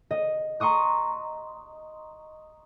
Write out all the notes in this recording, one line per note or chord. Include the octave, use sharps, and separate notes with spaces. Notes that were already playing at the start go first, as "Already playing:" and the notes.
D#5
A#5 C6 C#6 D#6 F#6